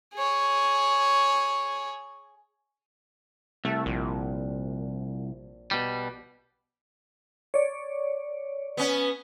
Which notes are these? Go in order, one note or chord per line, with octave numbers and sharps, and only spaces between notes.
G#4 C#5
C2 A3
A#1
B2 G3
C#5 D5
B3 C#4